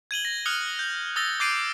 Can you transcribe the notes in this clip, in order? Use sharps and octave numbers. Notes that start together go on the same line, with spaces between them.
G#6 D#7 F#7 G7
A#6
D#6 F6 F#6 C#7 F#7 G7
G6
D#6 E6 A6 A#6 G7
D6 G6 A6 C7 D7 D#7